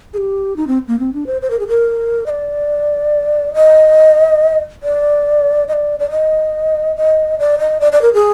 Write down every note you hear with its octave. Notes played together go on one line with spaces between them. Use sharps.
G#4
G4
D#4
C4
A#3
C4
D4
C5
C5
A#4
G#4
A#4
D#5
D5
D#5
D5
D#5
D5
D5
D#5
D#5
D5
D#5
D5
D5
A#4
G#4